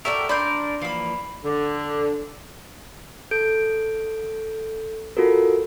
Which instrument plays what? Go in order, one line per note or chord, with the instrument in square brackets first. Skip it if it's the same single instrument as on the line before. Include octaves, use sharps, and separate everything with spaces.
[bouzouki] F#4 A4 D5 [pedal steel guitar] A#4 [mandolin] E5 G5
[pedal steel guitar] D4 A#4 [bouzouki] D5 [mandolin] B5 C6 G6
[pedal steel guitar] E3 F3 A#3 [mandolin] F5 B5
[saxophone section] D3
[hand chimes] A4 G6 D7
F4 F#4 A4 A#4